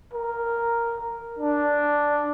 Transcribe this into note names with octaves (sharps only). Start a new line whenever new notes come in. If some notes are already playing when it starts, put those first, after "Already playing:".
A#4
D4